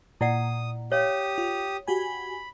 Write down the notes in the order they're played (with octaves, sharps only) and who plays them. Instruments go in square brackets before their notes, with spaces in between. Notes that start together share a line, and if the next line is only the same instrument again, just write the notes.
[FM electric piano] A#2 [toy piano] E4 D5 F#5 [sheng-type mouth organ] D#6
[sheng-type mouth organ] G4 D#6 [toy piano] C#5 F5
[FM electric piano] F4
[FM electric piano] F#4 G4 G#5 [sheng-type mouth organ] B5